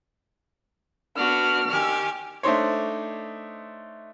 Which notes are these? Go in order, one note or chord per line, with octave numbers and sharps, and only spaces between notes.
B3 D4 F#4 F6
D#3 G4 G#5
A3 D4 D#4 C5 C#5